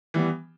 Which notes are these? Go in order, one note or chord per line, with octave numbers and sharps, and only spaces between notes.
E3 G3 B3